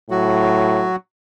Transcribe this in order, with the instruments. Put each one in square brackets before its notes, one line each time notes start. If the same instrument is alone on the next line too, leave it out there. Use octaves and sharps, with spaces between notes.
[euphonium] A2 [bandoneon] F#3 F#4